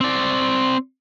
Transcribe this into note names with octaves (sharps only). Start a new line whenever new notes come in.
C4 D5